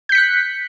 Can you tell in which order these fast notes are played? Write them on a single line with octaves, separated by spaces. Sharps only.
G6 B6 C#7 F#6